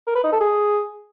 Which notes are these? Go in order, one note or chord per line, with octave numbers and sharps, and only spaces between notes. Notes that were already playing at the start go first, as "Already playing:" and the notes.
A#4
B4
D#4
A4
G#4